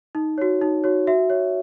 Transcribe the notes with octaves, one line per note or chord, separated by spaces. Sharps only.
D#4
F#4 C#5
D#4
F#4 C#5
F#4 E5
C#5